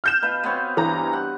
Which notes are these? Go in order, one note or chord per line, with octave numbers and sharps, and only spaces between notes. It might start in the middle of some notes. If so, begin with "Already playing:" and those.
F6 G6 E7
B2 B4 F5
B3 C4 C#5
G2 E3 A#5
F#5